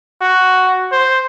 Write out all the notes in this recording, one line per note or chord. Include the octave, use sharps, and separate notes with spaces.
F#4
C5